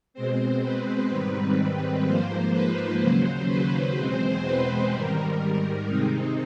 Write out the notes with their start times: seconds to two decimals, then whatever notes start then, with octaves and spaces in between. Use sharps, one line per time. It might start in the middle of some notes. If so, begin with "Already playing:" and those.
0.14 B2 G#3 C4 C5
0.62 B4
1.09 G#2 D#3 G3 C4
2.04 G#2 F3 A#3 C5
2.52 B4
3.00 D#2 C#3 F#3 C5
3.48 B4
3.95 E2 B2 G#3 C4 C5
4.44 B4
4.91 G#2 D#3 G3 A#4
5.86 C3 D#3 G#3 C4 D#4